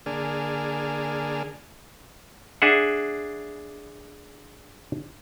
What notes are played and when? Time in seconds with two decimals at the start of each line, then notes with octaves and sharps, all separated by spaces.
0.06 D3 A#3 D4 G#4 F6
2.62 D4 G#4 E5 F#5